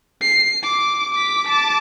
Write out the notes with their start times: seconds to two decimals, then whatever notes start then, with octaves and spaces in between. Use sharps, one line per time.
0.21 C7
0.63 D6
1.15 D6 B6
1.47 A5 D6